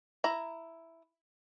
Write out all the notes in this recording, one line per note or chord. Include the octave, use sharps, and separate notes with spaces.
E4 A#5